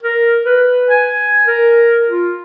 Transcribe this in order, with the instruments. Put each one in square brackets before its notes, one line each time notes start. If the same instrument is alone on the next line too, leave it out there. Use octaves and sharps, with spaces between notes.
[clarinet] A#4
B4
G#5
A#4
F4